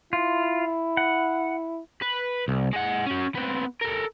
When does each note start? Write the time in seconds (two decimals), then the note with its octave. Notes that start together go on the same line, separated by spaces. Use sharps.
0.13 E4 F4
0.97 F#5
2.02 B4
2.48 C2
2.73 G#3 F#5
3.06 C#4 F#4
3.35 B3 C4
3.81 A4 A#4